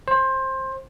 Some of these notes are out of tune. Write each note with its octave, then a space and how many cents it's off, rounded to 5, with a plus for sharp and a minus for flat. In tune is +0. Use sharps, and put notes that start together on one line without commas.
C5 +20